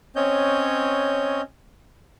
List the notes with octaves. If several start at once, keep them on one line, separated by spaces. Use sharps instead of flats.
C4 C#4 C#5 D#5 G6